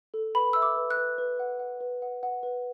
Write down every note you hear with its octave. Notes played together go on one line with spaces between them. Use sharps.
A4
B4 B5
E5 E6
D6
B4
F#6
B4
B4
F#5
F#5
B4
F#5
F#5
B4